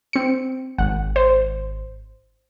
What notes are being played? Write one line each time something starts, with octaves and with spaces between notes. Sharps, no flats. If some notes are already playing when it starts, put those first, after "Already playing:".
C4 C#7
G#1 F#5
C5